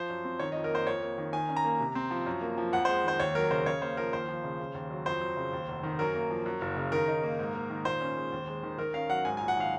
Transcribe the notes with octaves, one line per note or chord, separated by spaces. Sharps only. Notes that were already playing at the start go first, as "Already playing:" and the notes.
Already playing: F3 C5
F#2
C4
D#3 C#5
D#5
F2
A#4
A#3 C5
F2 C#5
A#3
D#3
D#3 G#5
C#4
A#5
A#3
C3
C4
F3
F#2
A#3
F3
F2 F#5
C5
G#3
D#3 C5
D#2 C#5
F#3 A#4
C#3 C5
C#3 C#5
A#3 C5
F3 A#4
D#2 C5
F3
C#3
C#3
D#2
F#3
F2 C5
F#3
C#3
D#2
F1
D#3
F#2 A#4
A#3
F3
F#2
F#1
C#3
D#3 A#4
D#4
A#3
G#2
A#3
D#3
A#2 C5
C#4
G#3
D#2
G#3
D#3
D#3 A#4
C#4 F5
F#3 F#5
G#2 G#5
G#5
A#1
F#5
D#3 F5